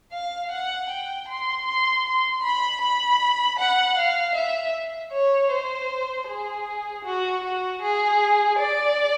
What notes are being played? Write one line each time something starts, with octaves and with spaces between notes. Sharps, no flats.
F5
F#5
G5
C6
C6
C6
B5
B5
F#5
F5
E5
C#5
C5
G#4
F#4
F#4
G#4
D5